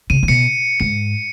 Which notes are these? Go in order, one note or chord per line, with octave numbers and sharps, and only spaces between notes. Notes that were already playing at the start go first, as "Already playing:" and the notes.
C#3 D#7
C#3
B2 C#7
G#2 C#7